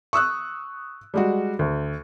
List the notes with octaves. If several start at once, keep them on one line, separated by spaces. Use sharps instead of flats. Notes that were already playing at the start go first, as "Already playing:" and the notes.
C#6 D#6 E6 F#6
G3 G#3 F#4
D2